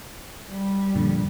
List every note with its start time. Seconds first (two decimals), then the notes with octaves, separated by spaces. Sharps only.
0.50 G3
0.95 F2 A#2 D3